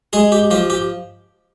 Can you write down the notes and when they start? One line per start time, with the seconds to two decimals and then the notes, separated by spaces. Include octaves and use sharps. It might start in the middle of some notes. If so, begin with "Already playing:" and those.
0.13 G#3 G#4
0.32 G4
0.51 F3 G4
0.70 G4